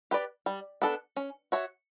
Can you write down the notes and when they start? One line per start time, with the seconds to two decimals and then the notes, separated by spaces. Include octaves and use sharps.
0.11 G4 B4 D5
0.46 G3
0.82 B3 D4 A4
1.16 C#4
1.52 F#4 C#5 E5